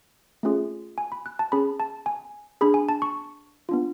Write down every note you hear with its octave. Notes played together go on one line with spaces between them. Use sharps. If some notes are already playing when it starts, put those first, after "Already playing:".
A3 C#4 F4 G#4
G#5
B5
F#6
A5
C#4 G#4 B5
A5
G#5
D4 G#4 B5
G#5
A5
C#6
B3 D4 F4